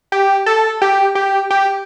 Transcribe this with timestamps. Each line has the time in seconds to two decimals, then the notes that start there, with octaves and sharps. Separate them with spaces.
0.12 G4
0.46 A4
0.82 G4
1.15 G4
1.50 G4